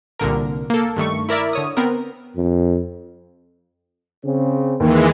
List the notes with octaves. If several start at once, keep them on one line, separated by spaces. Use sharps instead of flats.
C2 A#2 D3 A#4
A#3 A4
G2 D#3 A3 C#6
E4 A#4 D5 E5
D3 C#5 D#6
B3 C4 A#4
F2
C#3 C4 C#4
D#2 D#3 E3 G#3